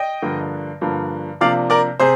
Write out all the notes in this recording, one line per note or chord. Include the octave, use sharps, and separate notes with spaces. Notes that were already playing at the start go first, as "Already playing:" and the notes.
Already playing: D#5 G5
G2 D3 F3 A#3
G2 D3 F3 A#3
C3 F3 A#3 D4 D5 F5
A#4 D5
C3 G#4 C5